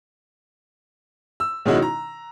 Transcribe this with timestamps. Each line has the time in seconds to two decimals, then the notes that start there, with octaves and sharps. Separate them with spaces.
1.40 E6
1.65 B2 D#3 G#3 C#4 E4 F#4
1.82 A#5